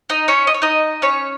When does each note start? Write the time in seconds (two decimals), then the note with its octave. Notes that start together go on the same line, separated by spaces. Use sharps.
0.10 D#4 D#5
0.28 C#4 C#5
0.47 D#5
0.54 C#5
0.62 D#4 D#5
1.02 C#4 C#5